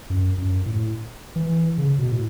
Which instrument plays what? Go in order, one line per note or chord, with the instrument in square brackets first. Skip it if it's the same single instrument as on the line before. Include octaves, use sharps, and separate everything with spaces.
[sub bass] F#2
F#2
A2
E3
C#3
B2
A2